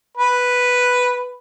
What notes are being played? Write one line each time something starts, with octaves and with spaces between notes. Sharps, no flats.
B4